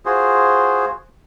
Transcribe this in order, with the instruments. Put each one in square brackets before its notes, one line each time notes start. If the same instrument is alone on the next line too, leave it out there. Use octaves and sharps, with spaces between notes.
[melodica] F4 F#4 G#4 C5